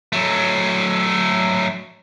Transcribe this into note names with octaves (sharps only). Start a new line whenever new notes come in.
F#3 A3